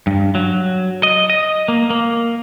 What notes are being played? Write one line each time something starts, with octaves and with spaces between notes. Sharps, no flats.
G2
F#3
D#5
D#5
A#3
A#3